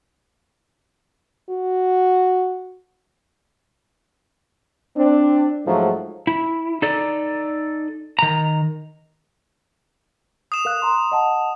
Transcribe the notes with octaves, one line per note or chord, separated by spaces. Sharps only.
F#4
C4 D4
G#2 F3 F#3 A3
E4
D#4 A4 D5
D#3 A#5
D#6 E7
A#4 F5 F#6
A#5 C6
D#5 F#5 A5